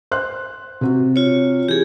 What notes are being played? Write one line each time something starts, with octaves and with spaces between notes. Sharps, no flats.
C5 C6 F#6
C3 C4 F#4
F4 C#5
E3 G4 G#4